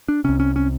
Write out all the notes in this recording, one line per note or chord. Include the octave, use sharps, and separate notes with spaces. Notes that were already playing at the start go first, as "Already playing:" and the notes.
D4
C2 C3 C#4
C#4
C#4